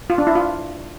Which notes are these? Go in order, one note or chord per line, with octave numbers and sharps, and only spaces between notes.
F4
D4
E4
F4